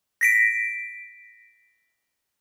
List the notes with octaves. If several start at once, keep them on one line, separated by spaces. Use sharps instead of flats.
A#6 B6 D7